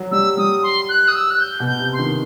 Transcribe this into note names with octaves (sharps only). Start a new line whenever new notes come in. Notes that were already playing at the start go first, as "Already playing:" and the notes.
Already playing: F#3
G3 E6
G3 D#6
C6
F#6
D#6
E6
F#6
G6
B2
G6
C3
C6
D#3